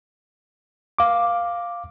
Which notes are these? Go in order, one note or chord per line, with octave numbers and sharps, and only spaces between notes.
F5 D6